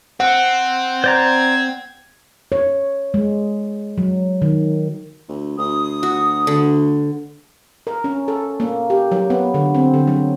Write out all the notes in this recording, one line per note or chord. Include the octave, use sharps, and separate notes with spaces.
C4 F#5
C5 D5 A#5 G#6
C#5
G#3
F#3
D#3
D2
D2 D#6
F#4
D3
A#4
C#4
A4
A#3
G4
F#3
B3
D3
C4
D3
F#3